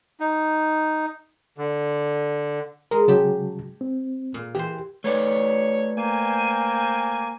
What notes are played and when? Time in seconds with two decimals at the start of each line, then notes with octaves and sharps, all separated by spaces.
0.20 D#4
1.58 D3
2.91 G#3 A#4
3.08 C#3 F#3 G4 A5
3.81 C4
4.34 A#2
4.55 E3 G4 C5
5.04 A3 B4 C#5 D5
5.97 A#3 C5 G5 G#5